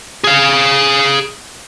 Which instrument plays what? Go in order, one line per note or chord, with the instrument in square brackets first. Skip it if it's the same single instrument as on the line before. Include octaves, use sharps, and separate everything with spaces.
[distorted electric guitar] G#4 F5